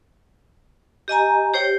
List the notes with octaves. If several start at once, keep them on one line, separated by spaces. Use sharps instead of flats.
G4 D#5 G#5 A#5
G4 C5 C#5 G5